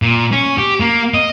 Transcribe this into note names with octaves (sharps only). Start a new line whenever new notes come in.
A#2
C#4
G4
A#3
D#5